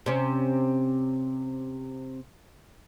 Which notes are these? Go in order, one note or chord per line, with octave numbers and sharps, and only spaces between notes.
C3 C#4